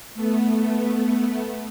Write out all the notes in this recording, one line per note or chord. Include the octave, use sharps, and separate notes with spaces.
A3 B3